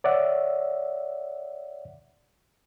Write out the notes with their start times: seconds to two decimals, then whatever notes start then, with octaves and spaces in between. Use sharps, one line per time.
0.04 C#5 D5 E5 F#5